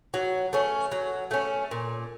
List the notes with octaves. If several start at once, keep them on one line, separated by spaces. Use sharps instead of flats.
F#3
A3 C#4
F#3
A3 C#4
A#2